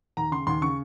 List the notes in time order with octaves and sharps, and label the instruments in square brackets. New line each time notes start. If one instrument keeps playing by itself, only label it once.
[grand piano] D#2 A#5
C#3 C6
D#2 C6
C#3 C#6